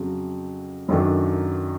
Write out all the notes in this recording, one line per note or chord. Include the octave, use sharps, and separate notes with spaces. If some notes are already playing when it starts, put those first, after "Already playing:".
Already playing: F2 C#3 F#3
F#2 D#3 F#3 A3 D4